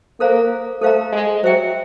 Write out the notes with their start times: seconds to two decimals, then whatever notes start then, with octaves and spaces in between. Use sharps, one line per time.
0.20 A#3 A4 C5 F5 A#5
0.81 A3 A4 C5 F5 A#5
1.12 G#3
1.43 F#3 C5 E5 G5